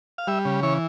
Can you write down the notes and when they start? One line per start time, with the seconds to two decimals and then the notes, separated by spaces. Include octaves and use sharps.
0.18 F5
0.27 G3 E5
0.45 C#3
0.63 E3 C#5